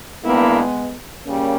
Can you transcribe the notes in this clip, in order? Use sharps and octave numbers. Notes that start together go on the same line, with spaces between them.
G2 D#3 G#3 A#3 B3 E4
C#3 G3 A#3 C#4